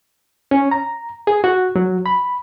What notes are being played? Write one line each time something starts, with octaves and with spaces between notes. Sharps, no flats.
C#4
A#5
G#4
F#4
F#3
B5